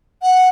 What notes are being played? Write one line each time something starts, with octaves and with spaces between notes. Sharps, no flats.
F#5